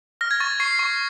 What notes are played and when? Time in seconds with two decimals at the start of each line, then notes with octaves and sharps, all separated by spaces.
0.21 F6 A#6
0.31 G#6
0.40 C#6 A6
0.60 C#6 C7
0.79 C#6